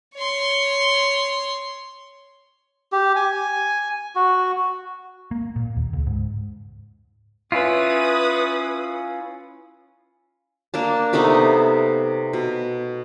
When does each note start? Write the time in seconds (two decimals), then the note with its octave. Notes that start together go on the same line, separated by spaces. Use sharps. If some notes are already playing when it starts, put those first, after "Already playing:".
0.15 C#5 C6
2.92 G4
3.16 G#5
4.15 F#4
5.31 A#3
5.56 A#2
5.77 D#2
5.93 C#2
6.06 G#2
7.52 C#4 E4 F4 B4 D#6
10.74 A#3 D4 A5
11.13 C3 A3 B3 D#4
12.33 B2